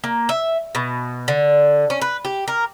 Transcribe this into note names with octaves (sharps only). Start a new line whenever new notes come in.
A#3
E5
B2
D3
C#4
B4
G4
A#4